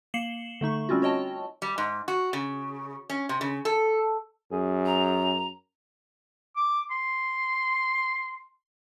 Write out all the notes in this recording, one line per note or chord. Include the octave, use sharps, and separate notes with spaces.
A#3 C7 C#7 E7 F#7 G7
D3 A3 D#4 C#6
G3 C4 C#4 F4 F#4
F#4 C#5 D#5 G5 A5
G3
G#2
F#4
C#3
C#4
C3
C#3
A4
F#2 G#4
A#5
D6
C6